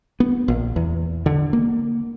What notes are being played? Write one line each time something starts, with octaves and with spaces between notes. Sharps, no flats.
B3
A#1
E2
D3
A#3